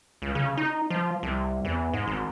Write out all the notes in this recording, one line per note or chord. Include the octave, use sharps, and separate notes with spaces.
C#2
C#3
D#4
F3
C2
E2
G#2
G#1